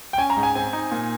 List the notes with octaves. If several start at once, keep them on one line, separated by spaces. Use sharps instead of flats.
G5
C#4 G#5
A#5
G#2
G#5
C4 G#5
D#4
A#2